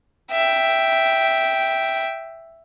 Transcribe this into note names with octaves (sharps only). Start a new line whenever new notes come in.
E5 G5